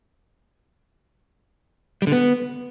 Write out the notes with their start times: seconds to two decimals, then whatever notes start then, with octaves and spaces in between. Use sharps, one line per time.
2.02 G3
2.07 D3
2.12 B3